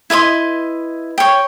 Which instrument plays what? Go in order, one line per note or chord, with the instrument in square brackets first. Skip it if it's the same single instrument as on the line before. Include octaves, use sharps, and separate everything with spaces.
[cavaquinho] E4 B4 D#5 C6
C#5 G5